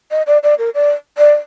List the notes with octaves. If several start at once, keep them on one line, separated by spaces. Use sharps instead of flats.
D#5
D5
D5
A#4
D5
D5